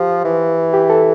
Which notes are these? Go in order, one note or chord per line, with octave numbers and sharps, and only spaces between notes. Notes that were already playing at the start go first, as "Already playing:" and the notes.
Already playing: F3 G4
E3
G4
A4